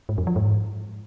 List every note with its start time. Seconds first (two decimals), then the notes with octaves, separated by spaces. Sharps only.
0.09 G#2
0.18 F2
0.27 F3
0.36 G#2